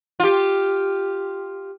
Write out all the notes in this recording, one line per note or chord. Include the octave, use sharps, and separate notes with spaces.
F4 G4